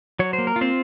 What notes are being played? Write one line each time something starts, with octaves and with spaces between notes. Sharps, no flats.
F#3 C#5
C5
A#3
A#4
F4
C4 C5